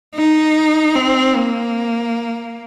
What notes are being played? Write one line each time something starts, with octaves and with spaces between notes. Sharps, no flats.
D#4
C4
A#3